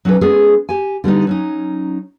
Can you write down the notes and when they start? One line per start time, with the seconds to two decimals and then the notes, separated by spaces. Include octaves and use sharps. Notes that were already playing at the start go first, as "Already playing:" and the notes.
0.05 F#3 C#4 D#4 A4 B4
0.21 G#3 B3 C#4 G#4 A4
0.69 G4 G#5
1.04 D3 G3 B3 D#4
1.27 F#3 C#4 D#4